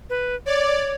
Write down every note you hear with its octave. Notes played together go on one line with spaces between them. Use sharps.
B4
C#5 D5